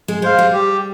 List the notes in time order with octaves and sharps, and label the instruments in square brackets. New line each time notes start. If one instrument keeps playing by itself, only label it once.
[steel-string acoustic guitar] G#3
[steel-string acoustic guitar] G#3 [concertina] C5 F5
[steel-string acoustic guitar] G3
[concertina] G4